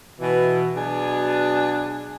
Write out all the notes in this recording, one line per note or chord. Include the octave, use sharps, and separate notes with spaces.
B2 E3
B2 F#3 D4 G#4 G#5